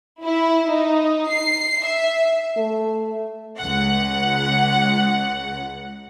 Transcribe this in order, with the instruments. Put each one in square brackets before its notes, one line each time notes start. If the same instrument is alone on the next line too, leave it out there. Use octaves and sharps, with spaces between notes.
[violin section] E4
D#4
C7
E5
[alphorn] A3
[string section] C#2 F#5